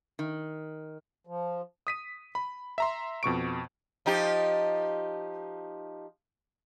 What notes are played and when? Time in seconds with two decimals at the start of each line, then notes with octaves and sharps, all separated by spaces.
0.19 D#3
1.27 F3
1.87 D#6 B6 D#7
2.35 B5
2.78 E5 A#5 C6
3.23 F2 B2 C#6 D7
4.06 F3 D#4 G4